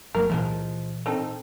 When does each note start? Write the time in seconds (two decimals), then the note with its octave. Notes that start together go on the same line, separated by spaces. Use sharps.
0.15 G1 F#3 A#3 A#4
0.30 A#2 E3 F3 G#3 B3
1.06 C4 D#4 A4